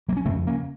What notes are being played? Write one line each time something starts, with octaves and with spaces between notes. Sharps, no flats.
F#3 A#3
C#4
F2 C#3 A3 C4
A#3 C#4